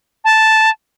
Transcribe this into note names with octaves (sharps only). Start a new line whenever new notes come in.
A5